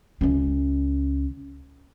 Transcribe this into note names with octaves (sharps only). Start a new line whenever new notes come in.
C#2 C#4